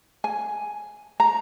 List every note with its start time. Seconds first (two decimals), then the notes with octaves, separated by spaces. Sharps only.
0.24 G#5
1.20 A#5